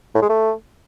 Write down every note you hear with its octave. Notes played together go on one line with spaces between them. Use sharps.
A2
G#3
A3